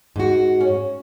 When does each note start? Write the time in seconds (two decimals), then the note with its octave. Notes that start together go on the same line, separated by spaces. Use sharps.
0.16 G#2 F#4
0.61 C#4